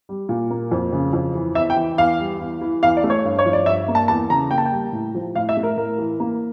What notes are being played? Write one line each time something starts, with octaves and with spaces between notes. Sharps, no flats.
G3
A#2
A#3
F2
C#3
F2
E3
E2 E5
G5
E3
E2 F5
G3
E2
E3
E2 F5
D5
A3
C#5
G2
C#5
F3
D5
G2 E5
A#3
A5
E2 A5
C#3 A#5
A#3 G5
A5
G5
G3
A2
F3
A2 F5
E5
A3
A#4
A2 A#4
E3
A#3